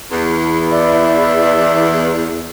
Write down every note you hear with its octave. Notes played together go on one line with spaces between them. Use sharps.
E2 E4
D5 E5